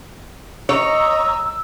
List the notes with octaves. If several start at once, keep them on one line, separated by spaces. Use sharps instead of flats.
C#5 D#5 A#5 E6